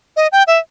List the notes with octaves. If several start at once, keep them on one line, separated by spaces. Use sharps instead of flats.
D#5
G5
E5